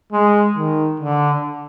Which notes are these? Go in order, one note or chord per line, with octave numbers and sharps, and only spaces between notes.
G#3
D#3
D3